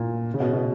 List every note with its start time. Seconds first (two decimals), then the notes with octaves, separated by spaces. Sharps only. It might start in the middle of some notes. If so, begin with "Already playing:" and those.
Already playing: A#2
0.34 C#3
0.40 B2
0.53 B2